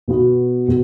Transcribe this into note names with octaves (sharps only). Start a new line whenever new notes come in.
B2 B3 F#4
B2